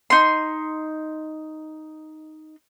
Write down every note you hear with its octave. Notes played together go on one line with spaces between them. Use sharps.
D#4 C6